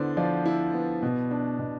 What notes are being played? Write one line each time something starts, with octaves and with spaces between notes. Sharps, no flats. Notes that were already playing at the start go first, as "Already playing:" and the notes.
Already playing: D3 B3 E4 C5 D5
F3 D5
E4
B3
B2
D4
B2